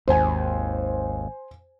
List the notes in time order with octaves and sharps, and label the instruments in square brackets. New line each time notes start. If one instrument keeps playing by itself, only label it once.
[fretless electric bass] G#1 [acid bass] D#2 [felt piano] C5 G#5